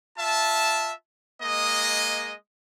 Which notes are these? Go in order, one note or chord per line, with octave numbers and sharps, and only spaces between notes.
F4 E5 A5
G#3 A#3 D#5